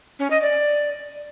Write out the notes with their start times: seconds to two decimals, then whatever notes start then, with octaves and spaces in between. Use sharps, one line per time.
0.19 C#4
0.31 D#5
0.42 D5